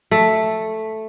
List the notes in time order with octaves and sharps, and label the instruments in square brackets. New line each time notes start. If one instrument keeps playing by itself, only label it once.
[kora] A3